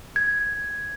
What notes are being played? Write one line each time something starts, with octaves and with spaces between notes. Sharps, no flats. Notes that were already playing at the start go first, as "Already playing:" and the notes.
G#6